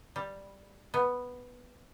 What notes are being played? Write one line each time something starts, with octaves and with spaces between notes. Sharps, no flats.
G3
B3